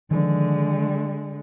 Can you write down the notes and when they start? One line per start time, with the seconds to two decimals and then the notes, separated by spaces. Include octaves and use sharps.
0.11 D3 D#3 F3 G#3